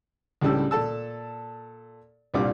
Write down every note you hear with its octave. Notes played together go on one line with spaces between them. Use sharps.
C#2 A2 C#3 G3 D4 E6
A#2 A4 A5 E6
C2 G2 A#2 G3 F4 D6